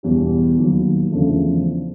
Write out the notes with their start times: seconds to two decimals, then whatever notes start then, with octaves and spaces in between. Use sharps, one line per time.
0.03 E2 B2 G3
0.58 D#2 D#3 F#3
1.12 E2 C#3 F3 A3 D4